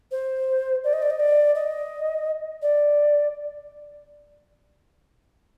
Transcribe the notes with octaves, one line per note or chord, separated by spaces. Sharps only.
C5
D5
D#5
D5
D#5
D5
D#5
D5